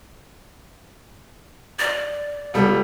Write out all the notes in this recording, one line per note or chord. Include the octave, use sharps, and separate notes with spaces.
D5
C#2 G3 A4 F#5